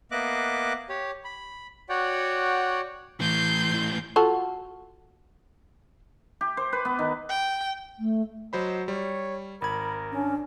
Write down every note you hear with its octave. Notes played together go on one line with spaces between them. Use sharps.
A#3 B3 D#5 E5 D6 F#6
G4 C#5
B5
F#4 C#5 D5 F#5 G5
A2 E3 C6 G6
F4 F#4 A4
G4
C5
B4
B3
D#3
G5
A3
F#3 C5 D#5 B5
G3 C#5
G#1 A#4 B5 G#6
C#4 D4